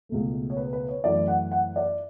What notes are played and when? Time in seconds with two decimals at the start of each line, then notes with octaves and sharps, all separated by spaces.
0.09 C#2 B2 A3
0.50 C#5
0.57 B4
0.73 B4
0.89 C#5
1.04 F#2 E3 A3 D5
1.28 F#5
1.51 F#5
1.76 D5